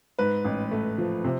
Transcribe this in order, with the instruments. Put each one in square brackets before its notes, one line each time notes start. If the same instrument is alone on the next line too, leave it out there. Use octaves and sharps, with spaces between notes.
[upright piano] G#2 B4
A1
A3
F3
C3